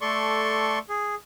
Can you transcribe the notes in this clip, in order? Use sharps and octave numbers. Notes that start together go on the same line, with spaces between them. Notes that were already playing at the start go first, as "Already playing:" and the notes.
A3 A4 D5 C6 C#6
G#4